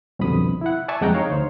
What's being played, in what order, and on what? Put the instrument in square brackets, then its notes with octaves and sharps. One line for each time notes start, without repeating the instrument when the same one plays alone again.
[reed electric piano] C2 F2 B2 D3 B5 D#6
E4 F#5
D5 E5 G#5 A5 C#6
F2 G#3 F#5 G5 A#5
D#4 C#5 F5
D2 C5